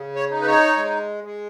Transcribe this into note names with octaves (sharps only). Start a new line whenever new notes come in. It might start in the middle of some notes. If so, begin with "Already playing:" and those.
Already playing: C#3
C#5
D#4
B4
C#5
G#3
G#3